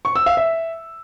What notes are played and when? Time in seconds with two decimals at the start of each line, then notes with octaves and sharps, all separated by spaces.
0.05 C#6
0.16 E6
0.26 F5
0.37 E5